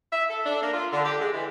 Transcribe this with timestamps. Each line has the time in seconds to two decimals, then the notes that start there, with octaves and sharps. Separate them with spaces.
0.13 E5
0.30 A4
0.46 D4
0.62 A#3
0.73 F4
0.92 D3
1.05 G4
1.21 G#3
1.33 E3